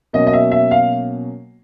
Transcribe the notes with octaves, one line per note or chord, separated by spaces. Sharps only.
B2 F#3 A#3 C#4 D#5
D#5
E5
E5
F5